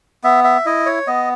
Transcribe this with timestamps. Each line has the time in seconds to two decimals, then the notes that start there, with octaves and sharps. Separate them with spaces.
0.24 B3 E5
0.44 E5
0.66 E4 D#5
0.86 C#5
1.07 B3 D#5